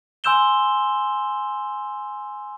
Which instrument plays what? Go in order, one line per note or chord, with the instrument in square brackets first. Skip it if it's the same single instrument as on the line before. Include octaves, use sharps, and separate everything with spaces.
[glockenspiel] G#5 C6 E6 G6 E7 G7